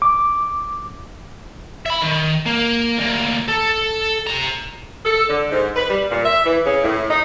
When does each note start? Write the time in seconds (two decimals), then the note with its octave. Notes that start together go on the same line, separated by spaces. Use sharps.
0.02 D6
1.86 E5 B5
2.02 D#3
2.46 A#3
2.98 D2 A#3
3.49 A4
4.27 C3 A#5
5.05 A4
5.29 D3
5.51 G#2
5.76 B4
5.89 G3
6.11 A#2
6.24 E5
6.45 E3
6.65 C#3
6.83 A2
7.10 D#4